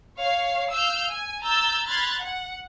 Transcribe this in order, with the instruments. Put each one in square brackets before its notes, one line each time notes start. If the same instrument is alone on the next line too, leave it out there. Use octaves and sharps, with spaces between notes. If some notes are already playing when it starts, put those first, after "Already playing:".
[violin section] C#5 F5 C7
F5 E6 F6 G6
G#5
A#5 E6 G6 A6
B5 C6 F6 F#6 G#6 A6
F#5